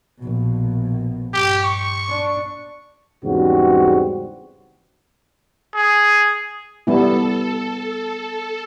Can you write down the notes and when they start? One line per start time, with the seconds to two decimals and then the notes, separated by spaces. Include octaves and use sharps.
0.19 A#1 B2
1.34 G2 G4
1.64 C#6
2.10 D4
3.24 E2 G#2 C#3 G3 C4 F#4
5.75 G#4
6.87 G3 B3 E4 A4